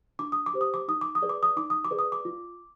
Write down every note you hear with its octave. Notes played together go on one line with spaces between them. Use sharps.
D4 D6
D#6
D6
G4 C5
D#6
D6
D#4 D#6
D6
D#6
G#4 B4 D5
D6
D#6
D#4 D6
D#6
D6
G#4 B4 D5
D#6
D6
F4